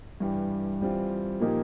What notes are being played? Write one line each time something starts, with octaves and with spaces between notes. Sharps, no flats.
G2 E3 G3
E3 G3 C4 F4
A#2 F3 A#3 D#4 G4